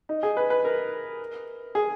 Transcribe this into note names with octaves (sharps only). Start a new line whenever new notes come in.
D#4
G#4
B4
B4
A#4
G#4